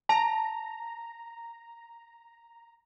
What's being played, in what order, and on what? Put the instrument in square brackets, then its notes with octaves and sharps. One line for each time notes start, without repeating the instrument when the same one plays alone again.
[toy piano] A5 [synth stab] A#5